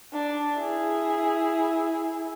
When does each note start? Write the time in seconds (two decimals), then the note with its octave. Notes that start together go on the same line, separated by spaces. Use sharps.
0.13 D4
0.59 E4 G#4